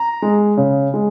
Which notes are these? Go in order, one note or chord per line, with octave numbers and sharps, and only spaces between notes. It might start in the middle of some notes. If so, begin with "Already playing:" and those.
Already playing: A#5
G#3
C#3
G#3